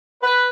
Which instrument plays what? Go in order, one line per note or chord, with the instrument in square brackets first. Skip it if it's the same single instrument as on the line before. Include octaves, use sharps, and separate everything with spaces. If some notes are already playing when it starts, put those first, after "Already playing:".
[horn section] B4